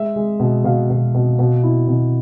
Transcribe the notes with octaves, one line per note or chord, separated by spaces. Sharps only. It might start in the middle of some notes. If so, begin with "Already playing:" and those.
Already playing: G#3 E5
G#3
B2
B2 F5
B2
B2
B2
E4
B2